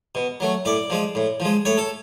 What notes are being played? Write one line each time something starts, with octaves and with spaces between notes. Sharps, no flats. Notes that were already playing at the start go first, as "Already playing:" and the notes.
B2
F#3 A3
A2 D5
F3 G#3
A2
F3 G#3
A2 C#5
A4